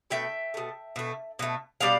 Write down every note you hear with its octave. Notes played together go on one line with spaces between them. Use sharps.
B2 A3 E5 G5
B2 A3
B2 A3
B2 A3
B2 G3 D5 F5